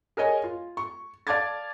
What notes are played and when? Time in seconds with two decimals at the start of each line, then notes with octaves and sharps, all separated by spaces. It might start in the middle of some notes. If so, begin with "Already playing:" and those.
0.17 G#4 A#4 C#5 D#5 G#5
0.44 F4
0.77 C#6
1.27 D5 F5 A5 D6 G#6 A6